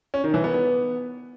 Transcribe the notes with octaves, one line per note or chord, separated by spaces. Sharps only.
C#4
D#3
E3
B3
B3